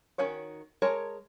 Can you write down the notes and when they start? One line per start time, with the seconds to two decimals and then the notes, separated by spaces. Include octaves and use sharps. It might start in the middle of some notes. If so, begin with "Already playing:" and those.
0.18 D#3 C#4 F#4 C#5
0.82 G#3 A#4 C#5 A5 A#5